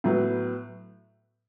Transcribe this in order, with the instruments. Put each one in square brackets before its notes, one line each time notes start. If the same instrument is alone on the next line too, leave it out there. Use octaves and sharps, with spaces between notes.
[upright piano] A2 F#3 B3